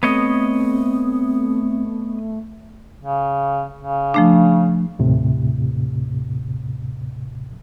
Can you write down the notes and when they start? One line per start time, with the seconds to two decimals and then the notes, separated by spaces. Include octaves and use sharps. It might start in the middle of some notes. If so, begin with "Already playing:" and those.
0.03 A3 B3 C4 C#5 D#5
2.99 C#3
3.79 C#3
4.14 F3 A3 D4
4.99 D#2 A2 C3